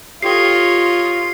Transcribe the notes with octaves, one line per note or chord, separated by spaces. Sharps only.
F4 G4 A4 C#5 D#5 G5 C7